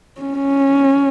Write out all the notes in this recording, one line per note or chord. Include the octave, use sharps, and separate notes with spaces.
C#4